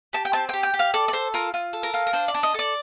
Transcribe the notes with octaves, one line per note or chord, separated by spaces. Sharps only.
G4 A5
G5
C4 A5
G4 G5
G5
G4
F5
A4 D5
D5
A4 C5
F4 A#4
F4
A4
A#4
F4
A#4
D4 C5
D5
D4
D#5
A4 D5